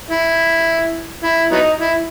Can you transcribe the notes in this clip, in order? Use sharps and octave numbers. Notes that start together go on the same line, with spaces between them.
E4
E4
F#3 B3 D#4
E4